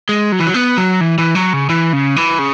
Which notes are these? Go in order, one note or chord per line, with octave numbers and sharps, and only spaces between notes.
G#3
F#3
E3
F#3
B3
F#3
E3
E3
F#3
C#3
E3
C#3
E3
C#3